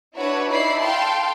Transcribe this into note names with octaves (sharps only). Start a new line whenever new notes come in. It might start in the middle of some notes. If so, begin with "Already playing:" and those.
D4 E4 F#4 B4 C#5
D#4 E4 D5 B5 C7
A4 F5 G5 A5 C6